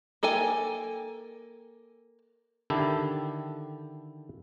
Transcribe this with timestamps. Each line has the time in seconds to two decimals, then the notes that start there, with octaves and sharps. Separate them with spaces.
0.23 A#3 A4 G5 G#5
2.70 D3 D#3 E4 G4 A4